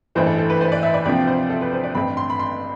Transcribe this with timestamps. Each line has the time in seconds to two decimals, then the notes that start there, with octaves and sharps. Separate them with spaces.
0.15 A1 G2 E3 A3 C5
0.26 A4
0.38 A4
0.50 B4
0.61 C5
0.72 D5
0.83 E5
0.94 D5
1.05 D2 C3 F3 C4 D5
1.27 C5
1.50 A4
1.61 B4
1.72 C5
1.84 D5
1.95 A1 G2 D3 A3 C4 B5
2.17 C6
2.30 B5
2.39 C6